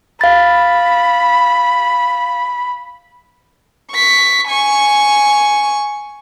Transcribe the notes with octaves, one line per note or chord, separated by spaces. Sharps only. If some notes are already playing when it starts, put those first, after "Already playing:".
F5 B5 A6
C#6 B6
G#5 C#6